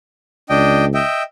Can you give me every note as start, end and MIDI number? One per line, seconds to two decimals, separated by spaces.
0.49 1.00 37
0.49 0.85 62
0.49 0.85 75
0.49 0.85 79
0.94 1.23 75
0.94 1.23 76
0.94 1.23 79